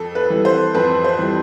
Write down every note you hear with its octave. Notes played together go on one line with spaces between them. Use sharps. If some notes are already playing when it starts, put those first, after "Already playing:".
Already playing: F2 A4
B4
E3 G3
C5
F2 B4
C5
E3 G3